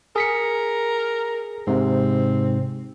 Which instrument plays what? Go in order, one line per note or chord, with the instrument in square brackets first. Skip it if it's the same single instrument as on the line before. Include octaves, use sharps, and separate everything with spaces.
[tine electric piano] G#4 B6 C#7 [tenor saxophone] A#4
[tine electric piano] G#2 C3 [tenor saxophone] C4